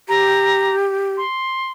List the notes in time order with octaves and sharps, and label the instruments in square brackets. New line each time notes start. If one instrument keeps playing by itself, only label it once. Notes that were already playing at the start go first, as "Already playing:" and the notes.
[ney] G4 [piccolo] A#5
[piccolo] C6